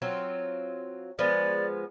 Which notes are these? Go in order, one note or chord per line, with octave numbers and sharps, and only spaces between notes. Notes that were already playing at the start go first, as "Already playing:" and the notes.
F#3 C4 F4
F3 G#3 B3 D5